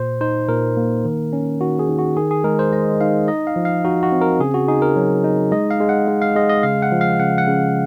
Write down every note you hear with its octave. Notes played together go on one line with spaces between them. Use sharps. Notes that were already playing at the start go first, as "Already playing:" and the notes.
Already playing: A#2 C5
D#4 C5
A#2 A#4
A#3
D#3
C#4
D#3 F#4
G#4
D#3
F#4
D#3 G#4
G#4
G#3 A#4
C5
G#3 D#5
D#4 F5
D#4 D#5
F5
F3
F5
D#4 F#4
F#4
C4
A#4
C#3 G#4
F#4
D#4 G#4
A#4
F#3
D#4
G#3 D#5
F5
G#3
F#5
G#3
F5
G#3 D#5
D#5
C#3 F5
F#5
F3
F5
C#3 F#5
F#5
C#3